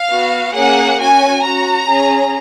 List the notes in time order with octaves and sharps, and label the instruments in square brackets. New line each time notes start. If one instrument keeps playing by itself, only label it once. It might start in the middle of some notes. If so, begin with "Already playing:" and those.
Already playing: [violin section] F5
B3 F#4
A#3 C#4 G#4 F#5
C#4 F#4 G#5
C#4 F#4 A#5
C#4 G#4